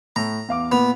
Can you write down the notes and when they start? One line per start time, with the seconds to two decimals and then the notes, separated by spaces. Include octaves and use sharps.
0.16 A2 A#5
0.48 E2 F5 D6
0.72 A#2 B3 F7